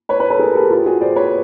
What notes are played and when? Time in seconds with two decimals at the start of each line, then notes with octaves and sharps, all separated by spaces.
0.09 B4 C#5
0.20 B4 C#5
0.30 A4 B4
0.39 G#4 A#4
0.55 G4 A4
0.70 F4 G4
0.86 F#4 G#4
1.01 C5 D5
1.16 B4 C#5